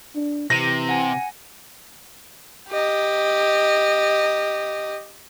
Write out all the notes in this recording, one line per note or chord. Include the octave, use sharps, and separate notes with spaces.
D4
C3 E3 A#6 D#7
F#5 G#5
G4 D#5